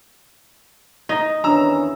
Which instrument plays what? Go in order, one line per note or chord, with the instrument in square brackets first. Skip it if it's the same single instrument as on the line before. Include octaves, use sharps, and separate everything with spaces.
[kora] D#4 [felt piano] A#6
[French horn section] E2 D#3 C#4 [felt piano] D4 [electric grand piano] A#5 E6